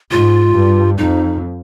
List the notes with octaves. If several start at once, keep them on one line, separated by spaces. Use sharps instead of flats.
G#2 F4
G2
F2 D#4